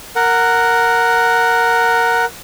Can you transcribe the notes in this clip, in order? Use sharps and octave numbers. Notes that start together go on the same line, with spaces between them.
A#4 F#5